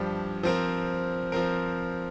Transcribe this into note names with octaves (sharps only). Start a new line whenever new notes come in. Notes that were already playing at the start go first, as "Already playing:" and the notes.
Already playing: G2 F3 D4 G4
F3 C4 A#4
F3 C4 A#4